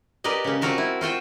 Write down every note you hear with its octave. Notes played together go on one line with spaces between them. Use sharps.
G4 A#4 B4 D5 D#5
C#3 A#3
C4 F4 F#4 A#4 A5
E4
F4 F#4 C5 G5